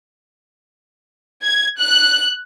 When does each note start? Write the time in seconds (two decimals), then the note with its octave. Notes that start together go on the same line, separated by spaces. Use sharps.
1.42 G#6
1.78 F#6